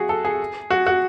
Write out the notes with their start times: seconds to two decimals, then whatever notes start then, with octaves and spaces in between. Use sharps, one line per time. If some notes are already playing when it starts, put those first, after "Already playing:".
Already playing: F#4 G#4
0.09 A4
0.25 G#4
0.71 F#4
0.87 F#4